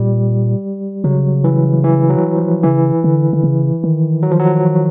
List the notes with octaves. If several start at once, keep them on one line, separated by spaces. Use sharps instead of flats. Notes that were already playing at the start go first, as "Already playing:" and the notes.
Already playing: A#2 G3
C#3 F#3
E3
E3
F#3
F3
C#3 E3
D3
D3
C#3
D#3
F#3
F3
F#3